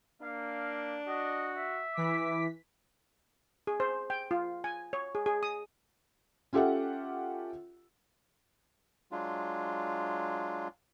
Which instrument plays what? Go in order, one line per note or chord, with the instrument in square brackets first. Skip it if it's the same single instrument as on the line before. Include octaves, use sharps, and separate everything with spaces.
[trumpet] A#3 [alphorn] D4 [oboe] F5
[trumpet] F#4 [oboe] D#5
[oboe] E5
[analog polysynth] E3 B6 [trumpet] D6
[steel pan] G#4
C5
G5
F4
G#5
C#5
G#4
G#4
D#6
[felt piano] C#4 F4 G4 A4 E5 F#5
[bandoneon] F#3 G#3 D4 F4